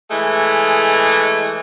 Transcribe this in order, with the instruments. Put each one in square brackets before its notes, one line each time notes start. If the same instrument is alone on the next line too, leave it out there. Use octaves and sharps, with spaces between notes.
[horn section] E3 G#3 A3